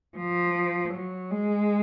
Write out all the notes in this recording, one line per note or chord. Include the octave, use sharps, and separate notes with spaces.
F3
F#3
G#3